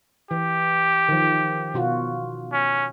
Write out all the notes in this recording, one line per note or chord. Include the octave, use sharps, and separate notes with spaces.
E3 G4
D#3 F3
B2 F4 F#4
C#4